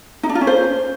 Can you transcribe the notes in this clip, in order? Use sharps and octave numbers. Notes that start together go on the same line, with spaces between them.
D#4
D4
F4
C#4
C5